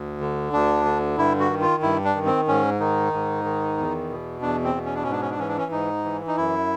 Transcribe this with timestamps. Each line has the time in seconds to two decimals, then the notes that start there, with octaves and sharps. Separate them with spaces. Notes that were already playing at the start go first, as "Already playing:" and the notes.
Already playing: D2
0.21 D3
0.53 D2 D4
0.85 D3
1.18 G2 E4
1.40 F#4
1.50 D#3
1.61 F4
1.82 G2 E4
2.04 D4
2.15 D#3
2.26 C4
2.47 G#2 C#4
2.80 D#3 D#4
3.13 G#2
3.44 D#3
3.77 E2
4.10 B2
4.42 E2 D4
4.64 C4
4.75 B2
4.85 C#4
4.94 D4
5.03 G#2 C#4
5.12 D4
5.21 C#4
5.31 D4
5.39 E3 C#4
5.48 D4
5.58 C#4
5.71 G#2 D#4
6.04 E3
6.27 D#4
6.37 F#2 E4